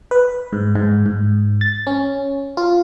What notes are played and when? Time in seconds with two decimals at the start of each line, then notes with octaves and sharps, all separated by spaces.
0.11 B4
0.53 G#2
0.75 G#2
1.06 G#2
1.61 A6
1.87 C#4
2.57 F4